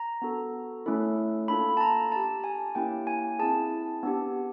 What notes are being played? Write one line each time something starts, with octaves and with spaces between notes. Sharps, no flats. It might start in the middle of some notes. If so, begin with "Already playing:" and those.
Already playing: A#5
B3 D4 F#4 A4
A3 C#4 E4 A4
A#3 D4 F4 A4 B5
A5
A#5
D4 G4 A5
G#5
A#3 C#4 E4 G4 G5
G#5
C4 E4 G#4 A5
B3 D4 G4